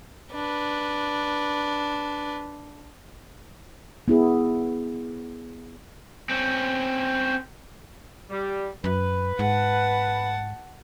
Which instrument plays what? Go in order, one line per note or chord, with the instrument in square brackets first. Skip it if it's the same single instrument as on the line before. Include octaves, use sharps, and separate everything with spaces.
[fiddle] D4 B4
[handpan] B3 E4 G#4
[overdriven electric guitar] C4 C#4
[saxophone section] G3
[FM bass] F#2 [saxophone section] B4
[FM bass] G#2 [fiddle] F#5 A5